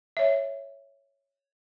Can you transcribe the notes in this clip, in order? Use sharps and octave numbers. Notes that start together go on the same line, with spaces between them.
C#5 E5